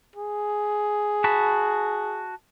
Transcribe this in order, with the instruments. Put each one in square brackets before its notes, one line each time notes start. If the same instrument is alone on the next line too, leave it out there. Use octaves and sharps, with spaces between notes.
[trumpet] G#4
[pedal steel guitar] F#4 A5 B5